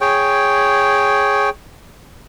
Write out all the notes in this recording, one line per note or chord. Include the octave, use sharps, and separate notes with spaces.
G#4 C#5 G5